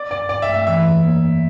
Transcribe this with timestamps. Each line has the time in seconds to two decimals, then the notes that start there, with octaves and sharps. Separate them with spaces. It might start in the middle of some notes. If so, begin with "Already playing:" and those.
Already playing: D5
0.11 G2 D5
0.29 G2 D5
0.42 E5
0.48 A3
0.54 E5
0.66 E3 E5
0.85 F2
1.04 A#3
1.23 A#3